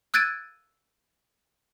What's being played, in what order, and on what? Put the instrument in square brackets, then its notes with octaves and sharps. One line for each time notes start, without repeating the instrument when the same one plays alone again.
[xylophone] E6 F#6 G#6 A6 D7 D#7